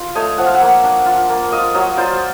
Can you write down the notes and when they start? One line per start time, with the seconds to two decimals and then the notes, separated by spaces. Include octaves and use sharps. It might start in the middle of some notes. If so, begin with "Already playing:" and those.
Already playing: F4
0.15 A3 C#5 D#5
0.38 F3 F#5
0.46 F5
0.54 E5 F#5
0.61 A#3
0.83 D4
1.06 F4
1.29 A#3
1.52 F4 D#5 F5
1.74 F#3 C#5 D#5
1.97 F4 C5 D5